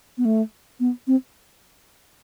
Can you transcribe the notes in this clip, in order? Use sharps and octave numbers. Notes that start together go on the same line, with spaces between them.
B3
A3
B3
C4